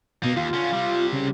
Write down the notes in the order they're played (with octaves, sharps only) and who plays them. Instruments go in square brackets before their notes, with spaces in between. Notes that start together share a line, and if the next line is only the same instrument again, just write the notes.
[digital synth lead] B2 [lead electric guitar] A#3 D#4
[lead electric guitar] D#2 [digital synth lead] F4
[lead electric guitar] D3 C#4
C3 G3
[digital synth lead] C#3